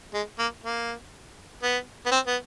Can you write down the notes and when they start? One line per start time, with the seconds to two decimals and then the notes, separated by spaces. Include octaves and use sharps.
0.14 G#3
0.39 A#3
0.63 A#3
1.63 B3
2.06 B3
2.11 C4
2.26 B3